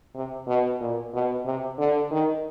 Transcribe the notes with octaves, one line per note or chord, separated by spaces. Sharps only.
C3
B2
A#2
B2
C3
D3
D#3